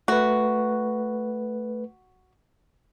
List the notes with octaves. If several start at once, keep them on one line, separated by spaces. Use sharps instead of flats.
A3 F#4 B4